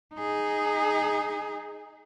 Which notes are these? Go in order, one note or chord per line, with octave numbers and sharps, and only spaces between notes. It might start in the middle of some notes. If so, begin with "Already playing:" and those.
D#4 G#4